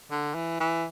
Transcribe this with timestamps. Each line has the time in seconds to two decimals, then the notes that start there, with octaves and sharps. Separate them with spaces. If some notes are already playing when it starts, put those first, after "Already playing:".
0.11 D3
0.35 E3
0.60 E3